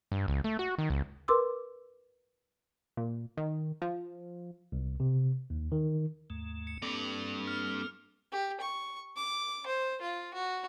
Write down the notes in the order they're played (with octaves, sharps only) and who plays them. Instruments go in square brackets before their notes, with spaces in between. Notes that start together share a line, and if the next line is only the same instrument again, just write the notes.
[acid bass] G2
C#2
A3
F#4
D#3
C#2
[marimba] A#4 B4 C6 D6 E6
[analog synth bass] A#2
D#3
F3
[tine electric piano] C2
C3
D#2
D#3
[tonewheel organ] D#2 G#2 A3
[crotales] C#7
[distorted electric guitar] G2 D5 [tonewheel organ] A#3 C4 A4 [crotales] F7
[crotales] F6
[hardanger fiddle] G4
C#6
D6
C5
F4
F#4